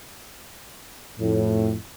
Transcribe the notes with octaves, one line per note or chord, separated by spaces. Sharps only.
F2 A2